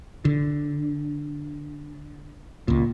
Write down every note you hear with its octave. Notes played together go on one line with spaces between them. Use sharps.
D3
C#2 A#2